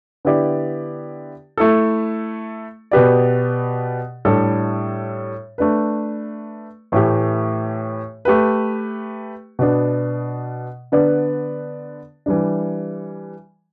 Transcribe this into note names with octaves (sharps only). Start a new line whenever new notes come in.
D3 B3 E4 G4 D5
A3 E4 A4
B2 B3 G4 B4 D5
A2 G3 D4 A4
A3 D4 B4
A2 E3 A3 E4 G4
A3 G4 B4
B2 B3 D4
D3 B3 D4 B4 D5
E3 G3 D4